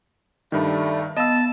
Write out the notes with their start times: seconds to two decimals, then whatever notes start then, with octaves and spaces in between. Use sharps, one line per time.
0.52 G2 D#3 G3 A3
1.17 B3 D#5 F5 A5 E6